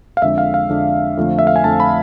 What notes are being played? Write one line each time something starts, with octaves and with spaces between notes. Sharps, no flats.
F5
F2 D3 G#3 D4 E5
F5
F5
F2 D3 G#3 D4
F2 D3 F3 A3
E5
F5
G#5
F2 D3 F3 A3 A5
B5